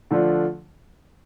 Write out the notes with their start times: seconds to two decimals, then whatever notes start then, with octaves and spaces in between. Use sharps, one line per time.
0.11 D3 F3 A3 D4 F4